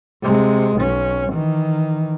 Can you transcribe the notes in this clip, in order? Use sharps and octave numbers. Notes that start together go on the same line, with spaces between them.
C3 G#3
B1 C#4
D#3 E3